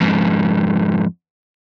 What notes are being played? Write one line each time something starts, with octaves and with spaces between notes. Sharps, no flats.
F2 G#2